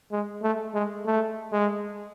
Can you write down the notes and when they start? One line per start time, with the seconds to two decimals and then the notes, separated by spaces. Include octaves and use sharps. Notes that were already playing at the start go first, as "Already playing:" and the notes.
0.12 G#3
0.42 A3
0.74 G#3
1.06 A3
1.52 G#3